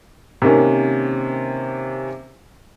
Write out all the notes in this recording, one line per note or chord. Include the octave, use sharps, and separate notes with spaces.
C3 D#3 A#3 C#4